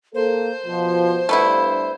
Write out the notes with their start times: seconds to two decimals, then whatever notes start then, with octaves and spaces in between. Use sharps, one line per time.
0.15 A#3 A4 C5
0.66 B2 F3
1.29 G2 A3 B3 E4